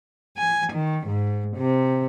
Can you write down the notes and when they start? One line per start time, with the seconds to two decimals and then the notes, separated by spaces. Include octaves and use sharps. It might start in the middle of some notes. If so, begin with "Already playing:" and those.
0.38 G#5
0.72 D#3
1.07 G#2
1.56 C3